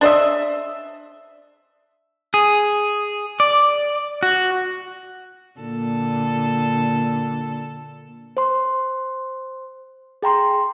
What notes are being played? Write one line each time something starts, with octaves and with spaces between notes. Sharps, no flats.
D4 C5 D#5 E5
G#4
D5
F#4
A#2 D3 A4
C5 C6
G#4 G5 A#5 C6